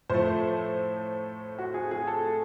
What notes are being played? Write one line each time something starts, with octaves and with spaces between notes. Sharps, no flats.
A2 F3 A3 C5
F#4
G#4
G#4
A4